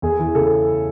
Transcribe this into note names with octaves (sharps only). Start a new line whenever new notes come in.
E2 G#4
E3
C#3 A4